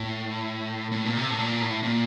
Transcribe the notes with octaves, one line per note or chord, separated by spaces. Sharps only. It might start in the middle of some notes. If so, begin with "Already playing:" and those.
Already playing: A2
A2
A#2
C3
A2
A#2
A2
A#2